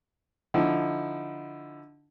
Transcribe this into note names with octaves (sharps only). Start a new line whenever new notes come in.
D3 F3 D#4 E4